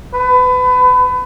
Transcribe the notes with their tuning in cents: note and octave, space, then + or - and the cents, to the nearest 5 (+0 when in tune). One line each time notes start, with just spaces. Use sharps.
B4 +30